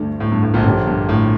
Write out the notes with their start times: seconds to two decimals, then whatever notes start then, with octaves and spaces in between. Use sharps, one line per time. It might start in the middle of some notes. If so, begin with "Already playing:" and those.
Already playing: D2 G2 D3 A3 D4
0.20 A2
0.31 G2
0.43 A2
0.54 A#1 A#2
0.65 A#1 A#2 D3 F3 C#4 G4
0.87 G2
1.09 A2